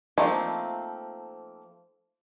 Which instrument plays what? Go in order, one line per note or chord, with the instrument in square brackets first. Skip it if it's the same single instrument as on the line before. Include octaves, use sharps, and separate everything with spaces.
[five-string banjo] F3 A3 A#3 C4 D#4